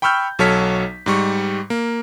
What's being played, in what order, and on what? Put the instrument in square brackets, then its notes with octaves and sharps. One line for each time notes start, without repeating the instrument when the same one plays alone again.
[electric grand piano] G5 B5 C#6 E6 F6 G6
B1 F#3 A4 C#5 F6 B6
G#2 G3 C#6
A#3